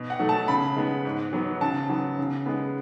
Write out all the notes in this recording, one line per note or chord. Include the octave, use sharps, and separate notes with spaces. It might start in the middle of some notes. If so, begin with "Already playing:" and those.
Already playing: B2
F#5
F#3 A3
A5
C#3 B5
G#3 B3
G#2
F#3 B3
C#3 A5
F#3 B3
C#3
G#3 B3